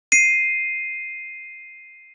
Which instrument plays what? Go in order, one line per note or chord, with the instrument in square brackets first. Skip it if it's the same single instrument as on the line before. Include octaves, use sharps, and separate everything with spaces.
[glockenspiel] C7 D#7